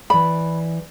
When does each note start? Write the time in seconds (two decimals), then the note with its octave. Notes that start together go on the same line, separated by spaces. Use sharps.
0.10 E3 D5 B5